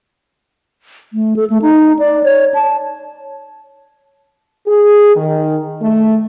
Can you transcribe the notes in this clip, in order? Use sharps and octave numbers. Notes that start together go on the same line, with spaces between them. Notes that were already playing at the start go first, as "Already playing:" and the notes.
A3
A4
A3
D#4
D5
C#5
A5
G#4
D#3
A3